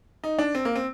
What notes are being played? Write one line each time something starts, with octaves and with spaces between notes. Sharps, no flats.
D#4
D4
C4
A#3
C4